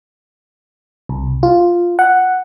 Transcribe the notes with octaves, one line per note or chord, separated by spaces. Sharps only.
C2
F4
F#5